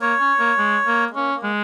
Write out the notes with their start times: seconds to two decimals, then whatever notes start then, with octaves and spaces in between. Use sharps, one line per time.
0.01 A#3 C#5
0.20 C#4
0.39 A#3
0.58 G#3
0.87 A#3
1.10 G#3
1.15 A#3 C#4
1.35 A#3
1.44 G#3